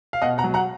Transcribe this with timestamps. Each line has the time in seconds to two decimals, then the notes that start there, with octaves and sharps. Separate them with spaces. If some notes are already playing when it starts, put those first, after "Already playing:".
0.13 F5
0.22 B2 D#5 F#5
0.38 F#5 A#5
0.44 F#3
0.54 F#5 A#5